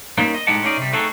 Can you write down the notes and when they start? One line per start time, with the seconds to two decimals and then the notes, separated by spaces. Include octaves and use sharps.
0.18 G3 A#3 C4 C#4 D#4
0.34 D#5
0.47 A2 G#3 D#4 G4 F#5 A5
0.63 C#4 D#4 G#4 D5
0.77 C3 G3
0.92 A3 C4 D#4 F#4 G#4 A4